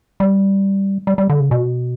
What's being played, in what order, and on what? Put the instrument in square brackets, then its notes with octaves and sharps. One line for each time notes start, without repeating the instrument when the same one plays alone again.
[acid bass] G3
G3
G3
D3
C#3
B2